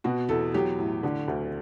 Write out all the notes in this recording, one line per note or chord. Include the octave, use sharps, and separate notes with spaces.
B2 F#4
E2 A4
F#3 G4
A2
D3
D2